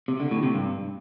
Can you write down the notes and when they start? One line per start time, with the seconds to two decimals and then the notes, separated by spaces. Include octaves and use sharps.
0.08 C3
0.20 D3
0.31 A2
0.43 C3
0.54 G2